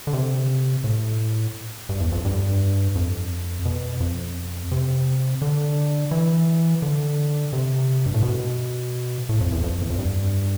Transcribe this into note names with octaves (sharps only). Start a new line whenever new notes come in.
D3
C3
A2
G2
E2
F2
G2
F2
B2
F2
C3
D3
E3
D3
C3
G2
A2
B2
A2
F2
E2
F2
E2
F2
G2